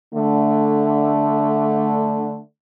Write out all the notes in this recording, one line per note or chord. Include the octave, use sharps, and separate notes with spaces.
D3 A3